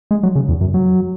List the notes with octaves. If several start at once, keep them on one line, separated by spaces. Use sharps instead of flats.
G#3
F#3
C#3
E2
F#2
F#3